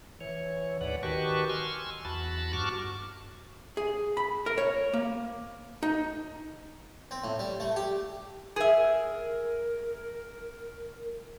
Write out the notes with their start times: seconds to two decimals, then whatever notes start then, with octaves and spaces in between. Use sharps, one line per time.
0.21 E3 C#5
0.81 D2 G#2 B4 D5 F#5
1.03 D#3 F#4 G4 B4 A5 C#6
1.50 G#5 C6 C#6 E6 F6
2.05 E2 F#4 A5 B5 A6
2.53 G2 F#4 A5 C#6 D6 F6
3.77 G#4
4.17 B5
4.46 A#4
4.58 C#5
4.93 A#3
5.83 D#4
7.11 C4
7.24 A2
7.39 G3
7.60 A3
7.76 G4
8.56 G#4 A#4 E5